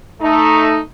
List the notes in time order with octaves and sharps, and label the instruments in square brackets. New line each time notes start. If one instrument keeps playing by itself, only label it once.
[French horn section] A3 D#4